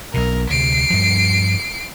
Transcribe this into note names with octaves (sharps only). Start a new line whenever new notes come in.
B1 B2 A#4
D2 C3 C7 D7
G2 F3